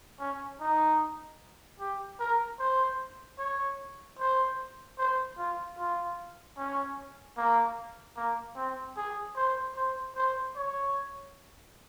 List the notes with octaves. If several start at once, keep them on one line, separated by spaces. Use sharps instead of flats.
C#4
D#4
G4
A#4
C5
C#5
C5
C5
F4
F4
C#4
A#3
A#3
C4
G#4
C5
C5
C5
C#5